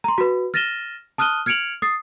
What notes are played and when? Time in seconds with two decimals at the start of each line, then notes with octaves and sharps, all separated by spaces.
0.04 A#5 C6
0.18 F#4 B4
0.54 F6 A6 A#6 D#7 E7 G7
1.18 A5 D#6 F6 F#6 D#7 G7
1.46 F6 G#6 C#7 D7 F7 F#7
1.82 D#6 A6 C7